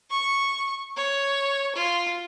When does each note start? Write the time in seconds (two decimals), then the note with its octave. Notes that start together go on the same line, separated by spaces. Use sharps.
0.11 C#6
0.96 C#5
1.75 F4